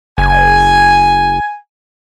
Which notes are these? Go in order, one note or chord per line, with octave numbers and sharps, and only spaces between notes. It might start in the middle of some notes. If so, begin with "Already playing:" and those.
F#1 G#5